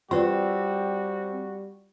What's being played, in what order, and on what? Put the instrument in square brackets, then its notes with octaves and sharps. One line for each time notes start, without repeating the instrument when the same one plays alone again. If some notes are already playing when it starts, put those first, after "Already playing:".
[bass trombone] G3 [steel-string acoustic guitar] C4 [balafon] F4 B4 D5 [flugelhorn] F#4